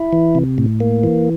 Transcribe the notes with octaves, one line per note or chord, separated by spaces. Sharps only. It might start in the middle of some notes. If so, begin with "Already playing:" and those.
Already playing: E4
E3
C3
A2
A#3
E3